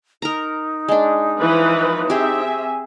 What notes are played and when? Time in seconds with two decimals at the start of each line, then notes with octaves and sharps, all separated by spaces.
0.22 D#4 A#4 A#5
0.88 G#3 D4
1.40 E3 F3 B4
2.10 C4 G4 G#4 E5
2.47 G#5